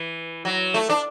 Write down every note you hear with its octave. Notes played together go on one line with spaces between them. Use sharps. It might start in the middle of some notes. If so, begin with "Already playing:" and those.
Already playing: E3
F#3
A3
D4